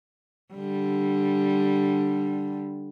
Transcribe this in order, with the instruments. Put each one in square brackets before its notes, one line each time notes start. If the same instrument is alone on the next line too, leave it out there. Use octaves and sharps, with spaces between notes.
[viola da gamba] D3 G3